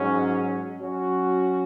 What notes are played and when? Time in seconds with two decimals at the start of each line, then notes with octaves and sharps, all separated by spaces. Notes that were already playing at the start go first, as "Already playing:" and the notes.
Already playing: G#2 F#3 C#4
0.80 F#3 C#4 F#4